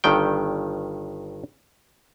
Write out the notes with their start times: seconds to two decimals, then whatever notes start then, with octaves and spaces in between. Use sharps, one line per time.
0.04 G1 G2 D#3 G5